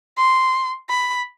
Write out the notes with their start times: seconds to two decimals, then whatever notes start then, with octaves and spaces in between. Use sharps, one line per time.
0.18 C6
0.89 B5